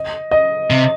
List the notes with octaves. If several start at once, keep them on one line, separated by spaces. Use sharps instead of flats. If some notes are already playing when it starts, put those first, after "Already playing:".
Already playing: D#5
D#5
C3